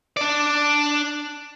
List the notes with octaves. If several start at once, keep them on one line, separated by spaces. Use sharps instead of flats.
D4 D5